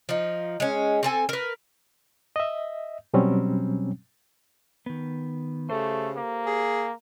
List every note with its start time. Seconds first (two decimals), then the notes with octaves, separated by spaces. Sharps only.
0.09 F3 D#4
0.60 G#3 C#4
1.03 C4 A4 G#5
1.29 A#4 B4
2.36 D#5 E5
3.14 B2 F#3 G3 C4 C#4
4.86 D#3 B3
5.70 C#3 A3 G4 A4 C5
6.17 A#3
6.46 G#4